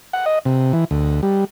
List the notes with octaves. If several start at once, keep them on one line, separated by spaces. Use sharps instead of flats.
F#5
D#5
C3
E3
D2
G3